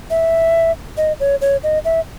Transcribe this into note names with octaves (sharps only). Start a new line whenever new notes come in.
E5
D#5
C#5
C#5
D#5
E5